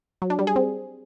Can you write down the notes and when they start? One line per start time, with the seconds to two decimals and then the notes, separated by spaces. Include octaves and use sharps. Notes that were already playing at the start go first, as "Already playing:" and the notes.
0.22 F#3
0.30 D4
0.39 G3
0.47 G#4
0.56 C4